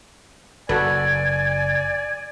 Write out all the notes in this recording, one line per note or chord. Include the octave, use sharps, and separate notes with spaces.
F#1 F#4 A4 B4 D5 G#5